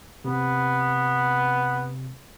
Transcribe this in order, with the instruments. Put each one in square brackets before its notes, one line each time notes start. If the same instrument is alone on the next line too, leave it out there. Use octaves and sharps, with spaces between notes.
[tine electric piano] C3 [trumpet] B3